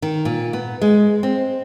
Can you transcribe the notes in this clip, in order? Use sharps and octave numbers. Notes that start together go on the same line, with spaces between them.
D#3
A#2
B3
G#3
C4